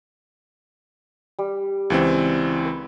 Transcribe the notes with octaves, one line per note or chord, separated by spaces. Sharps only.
G3
C#2 E3 C4
B4